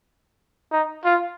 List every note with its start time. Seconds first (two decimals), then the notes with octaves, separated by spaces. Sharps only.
0.72 D#4
1.05 F4